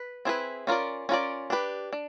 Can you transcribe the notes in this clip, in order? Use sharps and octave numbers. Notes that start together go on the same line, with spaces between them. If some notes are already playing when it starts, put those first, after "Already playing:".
Already playing: B4
C4 E4 G#4 B4
C#4 F4 A#4 D5
C#4 F4 A#4 D5
D4 G4 B4
D4